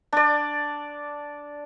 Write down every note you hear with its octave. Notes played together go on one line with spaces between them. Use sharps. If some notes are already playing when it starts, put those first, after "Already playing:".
D4 D5